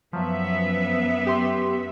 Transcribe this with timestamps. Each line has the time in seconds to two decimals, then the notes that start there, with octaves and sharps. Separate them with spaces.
0.13 F#2 F3 F#3 B3 E5
1.26 G4 C6